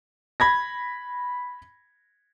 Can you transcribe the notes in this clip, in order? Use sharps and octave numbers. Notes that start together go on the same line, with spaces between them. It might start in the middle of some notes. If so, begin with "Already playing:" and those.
B5 G#6 A#6